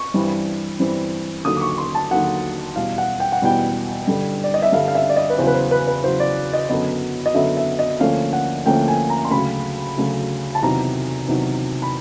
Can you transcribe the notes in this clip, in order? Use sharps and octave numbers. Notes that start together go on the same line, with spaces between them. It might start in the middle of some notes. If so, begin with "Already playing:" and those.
Already playing: C#6
G2 E3 G3 C4
G2 E3 G3 C4
D#2 D3 F#3 D#6
D6
C#6
C6
A5
D#2 D3 F#3 F#5
E2 B2 G3 F5
F#5
G5
F#5
E2 B2 G3 G5
G2 D3 G3
D5
D#5
E5
G2 D3 G3 F5
F5
E5
D5
D#5
B4
E2 C#3 F#3 C5
B4
C5
B4
B4
E2 C#3 F#3 C5
D5
D#5
F#2 D3 F#3 B3 D#5
D#5
F#2 D3 F#3 B3 E5
E5
D#5
D2 D3 F3 A#3 C#4 F5
F#5
D2 D3 F3 A#3 C#4 G5
G#5
A#5
C6
D2 C#3 F#3 B5
D2 C#3 F#3
A5
E2 C3 D#3 F#3 A#5
E2 C3 D#3 F#3
B5